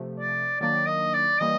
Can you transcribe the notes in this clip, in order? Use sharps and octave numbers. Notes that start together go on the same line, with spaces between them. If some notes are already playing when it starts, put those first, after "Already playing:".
Already playing: C3 F3 A3
D5
D#3 F#3 A#3 D4 D5
D#5
D5
E3 G3 A#3 D#5